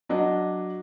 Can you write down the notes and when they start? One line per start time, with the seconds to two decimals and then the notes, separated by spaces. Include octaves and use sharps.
0.09 F#3 D4 D#5